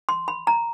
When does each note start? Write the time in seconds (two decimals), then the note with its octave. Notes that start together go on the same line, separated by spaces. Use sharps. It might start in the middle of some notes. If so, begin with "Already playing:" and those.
0.09 C6
0.28 B5
0.47 A#5